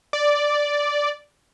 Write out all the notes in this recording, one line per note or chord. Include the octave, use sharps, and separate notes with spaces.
D5